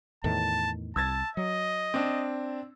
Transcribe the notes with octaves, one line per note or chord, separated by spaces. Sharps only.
E2 A2 D#3 A5
C2 A5 E6 G#6 A6
F#3 D#5
C4 D4